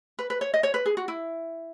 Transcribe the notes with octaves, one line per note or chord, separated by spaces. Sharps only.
B4
B4
C#5
D#5
C#5
B4
G#4
F#4
E4